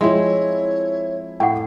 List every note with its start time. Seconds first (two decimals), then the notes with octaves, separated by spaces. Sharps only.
0.01 F3 G#3 C4 E4 C#5
1.40 A2 F#5 G5